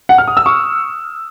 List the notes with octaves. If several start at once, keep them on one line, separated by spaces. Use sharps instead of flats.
F#5
F6
D#6
E6
C#6